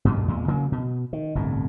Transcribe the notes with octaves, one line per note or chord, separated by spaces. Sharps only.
D2 G2 B2
E2 A#2 G#3
C#3 F#3 A#3
B2
D#3
G1 C2 A2